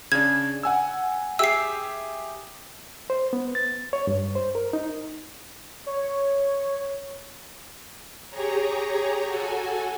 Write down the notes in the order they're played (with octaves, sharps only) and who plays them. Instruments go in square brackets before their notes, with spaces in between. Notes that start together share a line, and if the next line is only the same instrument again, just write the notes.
[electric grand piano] C#3 D4 [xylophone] G#6
[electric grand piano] F#5 G#5 E6
[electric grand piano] G4 G#4 E5 [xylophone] E6 C7
[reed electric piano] C5
B3
A6
C#5
G2
C5
A#4
D#4
[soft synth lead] C#5
[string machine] G4 G#4 C#5 A#5
F#4 A4 G#5